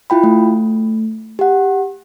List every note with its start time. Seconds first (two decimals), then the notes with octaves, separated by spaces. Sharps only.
0.10 E4 F4 G5 B5
0.23 A3
1.39 G4 F#5